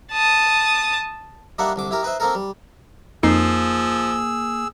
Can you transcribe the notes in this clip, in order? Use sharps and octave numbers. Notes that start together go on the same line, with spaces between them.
A5 D#6
G3 A#3 D4 D#4 E5 F#5
C2 D3 D6
E4 G4 A#4
D#4 B4 C5 E5
A#3 C4 D#4 A4 A#4
G3
F2 F3 A#3 D#4 G#4 E6 C7